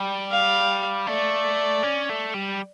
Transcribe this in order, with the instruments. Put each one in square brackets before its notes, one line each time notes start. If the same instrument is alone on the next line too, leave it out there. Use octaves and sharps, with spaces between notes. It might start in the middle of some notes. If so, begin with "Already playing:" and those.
Already playing: [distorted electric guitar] G3
[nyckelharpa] F5
[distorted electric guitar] A3 [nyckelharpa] D5
[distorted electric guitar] C#4
A3
G3